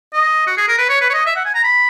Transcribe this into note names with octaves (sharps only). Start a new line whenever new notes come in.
D#5
F#4
G#4
A#4
B4
C#5
B4
C#5
D#5
E5
F#5
G#5
A#5
B5